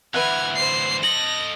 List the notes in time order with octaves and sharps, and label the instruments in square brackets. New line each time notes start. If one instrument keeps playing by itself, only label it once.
[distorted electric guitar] D2 E3 [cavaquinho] B4 E5 F#5 [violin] F6 G#6
[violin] C5 C7
[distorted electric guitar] A4 D#5 [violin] A#6 [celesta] F#7